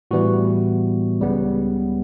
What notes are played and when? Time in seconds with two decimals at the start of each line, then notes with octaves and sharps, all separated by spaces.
0.11 A2 E3 G3 B3 F#4
1.20 C#2 C#3 G3 B3